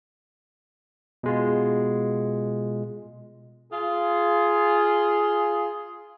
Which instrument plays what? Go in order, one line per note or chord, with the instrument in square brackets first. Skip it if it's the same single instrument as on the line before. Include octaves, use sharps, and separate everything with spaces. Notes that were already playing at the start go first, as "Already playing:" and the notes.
[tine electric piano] B2 G#3 F4
[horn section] F4 G#4